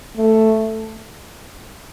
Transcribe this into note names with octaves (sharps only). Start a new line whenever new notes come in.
A3